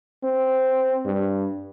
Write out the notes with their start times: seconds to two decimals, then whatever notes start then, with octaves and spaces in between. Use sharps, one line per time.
0.24 C4
1.05 G2